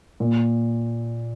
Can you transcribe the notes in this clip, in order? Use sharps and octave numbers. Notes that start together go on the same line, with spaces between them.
A#2